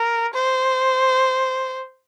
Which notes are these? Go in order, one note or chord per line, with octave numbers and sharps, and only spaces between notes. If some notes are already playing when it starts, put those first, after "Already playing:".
Already playing: A#4
C5